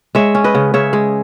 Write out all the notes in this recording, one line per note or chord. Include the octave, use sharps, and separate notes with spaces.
G#3 C#5 E5
C#4
B4 D#5
C#3
C#3 C#5 E5
G#3